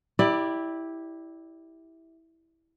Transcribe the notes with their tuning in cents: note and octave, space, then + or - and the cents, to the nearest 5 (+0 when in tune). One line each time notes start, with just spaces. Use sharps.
E4 -10 G4 +0 D5 +20